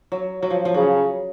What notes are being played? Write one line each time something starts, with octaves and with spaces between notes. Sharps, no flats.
F#3
F#3
F3
F3
C#3 F#3